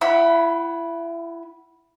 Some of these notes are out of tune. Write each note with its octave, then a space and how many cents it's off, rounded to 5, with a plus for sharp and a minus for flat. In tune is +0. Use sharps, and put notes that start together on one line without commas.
E4 +30 F#5 +20 B5 -10